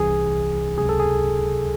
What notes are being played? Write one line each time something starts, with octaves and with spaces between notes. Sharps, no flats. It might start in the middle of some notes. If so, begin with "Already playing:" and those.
Already playing: C2 C3 E3 G#4
C#2 C3 F#3 G#4
A4
G#4